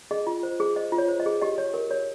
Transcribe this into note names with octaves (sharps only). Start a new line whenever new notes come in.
G#4 D#5
F4
C5
G#4
C5 D#5
F4
C#5
C5
D#5
G#4
G4 D#5
C#5
A#4
C#5